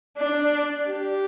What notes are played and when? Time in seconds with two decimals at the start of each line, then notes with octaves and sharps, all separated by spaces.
0.18 D4
0.87 G4